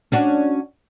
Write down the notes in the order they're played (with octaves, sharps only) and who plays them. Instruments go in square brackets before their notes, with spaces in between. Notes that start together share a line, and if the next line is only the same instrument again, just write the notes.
[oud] C#4 D4 F#4